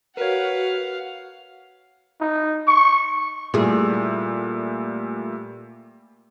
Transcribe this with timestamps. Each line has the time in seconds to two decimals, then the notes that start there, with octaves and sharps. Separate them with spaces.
0.17 F#4 A#4 B4 C#5 F5 F#5
2.21 D#4
2.67 C#6
3.54 A#2 G3 A3 E4 G#4